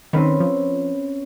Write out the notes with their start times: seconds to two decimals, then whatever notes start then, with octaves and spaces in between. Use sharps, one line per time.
0.13 D#3 C4 C#4 B4
0.40 F3